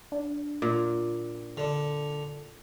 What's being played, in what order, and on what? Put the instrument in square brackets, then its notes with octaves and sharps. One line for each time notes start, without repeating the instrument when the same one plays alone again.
[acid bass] D4
[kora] A#2
[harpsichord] D3